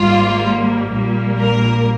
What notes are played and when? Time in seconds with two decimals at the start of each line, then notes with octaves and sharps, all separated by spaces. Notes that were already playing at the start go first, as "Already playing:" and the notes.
Already playing: G#1 G#2 G3 A#3 F4
0.90 A#1 A#2 G3 A#3
1.39 A#4